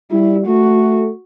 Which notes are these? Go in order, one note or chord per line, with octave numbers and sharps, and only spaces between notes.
G3 E4
A3 F#4